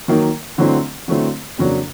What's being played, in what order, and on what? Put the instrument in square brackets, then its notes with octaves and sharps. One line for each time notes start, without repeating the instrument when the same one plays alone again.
[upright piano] D#3 F#3 A#3
D3 F#3 A3 C4 E4
D3 F#3 A3 C4 E4
F2 C#3 F#3 A#3 D4